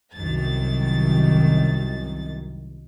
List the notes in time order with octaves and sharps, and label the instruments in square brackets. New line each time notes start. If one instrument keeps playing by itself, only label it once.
[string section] C2 F#2 D#3 A6